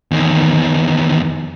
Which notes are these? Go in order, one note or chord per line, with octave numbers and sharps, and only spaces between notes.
E2 D#3